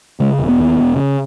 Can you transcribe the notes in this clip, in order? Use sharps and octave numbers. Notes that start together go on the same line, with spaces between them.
C#3 G#3
E1
B3
D#2
E1
C#3